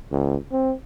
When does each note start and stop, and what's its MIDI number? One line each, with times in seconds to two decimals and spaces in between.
0.12 0.36 37
0.52 0.74 60